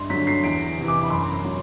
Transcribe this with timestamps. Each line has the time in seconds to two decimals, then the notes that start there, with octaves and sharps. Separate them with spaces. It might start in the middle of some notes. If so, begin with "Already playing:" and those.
Already playing: G2 C6
0.10 D3 F#3 B6
0.27 C7
0.44 E2 D7
0.78 C3 E3
0.88 D6
1.03 B5
1.10 F#2 C6
1.45 F#3